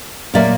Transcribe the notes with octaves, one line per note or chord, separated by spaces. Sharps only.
A#2 F#3 A#3 D5 E5